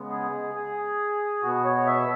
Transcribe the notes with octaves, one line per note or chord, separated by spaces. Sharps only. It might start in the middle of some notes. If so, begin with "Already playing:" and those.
Already playing: C#3 G#3 B3
G#4
G#4
B2 B3 F#4
C#5
E5